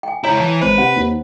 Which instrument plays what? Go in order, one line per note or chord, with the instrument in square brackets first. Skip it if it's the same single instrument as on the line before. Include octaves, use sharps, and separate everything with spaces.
[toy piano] G5 G#5
[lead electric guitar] C#2 E4 [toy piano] C#5 A#5
[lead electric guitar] E3 [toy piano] A5
[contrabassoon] G#1 [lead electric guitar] B4 [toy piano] C5
[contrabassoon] C3 [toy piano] F#5
[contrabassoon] D#2